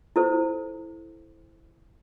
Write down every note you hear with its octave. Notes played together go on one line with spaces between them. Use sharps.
E4 A4 C5